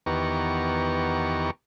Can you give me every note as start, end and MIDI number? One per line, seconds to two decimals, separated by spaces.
0.06 1.51 40
0.06 1.51 51
0.06 1.51 59
0.06 1.51 67
0.06 1.51 82
0.06 1.51 85